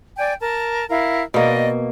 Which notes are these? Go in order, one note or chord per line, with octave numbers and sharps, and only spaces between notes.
D5 G5 G#5
A#4 A5
E4 A#4 F5
B2 A#3 D5 D#5